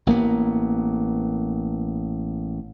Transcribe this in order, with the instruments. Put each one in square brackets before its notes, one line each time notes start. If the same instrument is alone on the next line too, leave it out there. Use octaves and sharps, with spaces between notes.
[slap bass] A1 A#3 B3